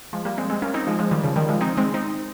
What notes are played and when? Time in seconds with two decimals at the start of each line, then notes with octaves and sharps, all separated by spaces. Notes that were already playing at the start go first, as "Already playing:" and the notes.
0.13 F3 G#3
0.25 G3 A#3
0.38 G#3 C4
0.50 G#3 C4
0.62 A#3 C#4
0.74 C4 D#4
0.87 F3 G#3
0.99 F3 G#3
1.11 D#3 G3
1.23 C#3 F3
1.36 D#3 G3
1.49 F3 G#3
1.61 C4 D#4
1.77 G#3 C4
1.94 C4 D#4